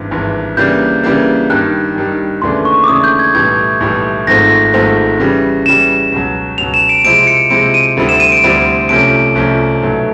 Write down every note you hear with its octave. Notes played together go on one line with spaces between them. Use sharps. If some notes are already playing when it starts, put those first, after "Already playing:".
Already playing: G#1 G2 E3
G#1 G2 E3
C#3 E3 G3 A#3 D4 G6
C#3 E3 G3 A#3 D4
G2 D#3 G3 F#6
G2 D#3 G3
D#2 C#3 E3 A3 D4 C6
C#6
D6
D#2 C#3 E3 A3 D4 D#6
G6
G#6
B1 A2 E3 G3 G#6
B1 A2 E3 G3
G#1 G#2 F3 A3 C4 A#6
G#1 G#2 F3 A3 C4
C#3 E3 G3
C#3 E3 G3 E7
C#2 B2 F#3
C#2 B2 F#3 F7
E7
D7
C3 F3 G#3 C4 E4 D7
C#7
C3 F3 G#3 C4 E4 D7
D#7
D2 D3 G3 C4 E4
E7
D#7
D7
D2 D3 G3 C4 E4
C2 C3 F3 A3 C#4 D7
C2 C3 F3 A3 C#4
B1 B2 F#3 A3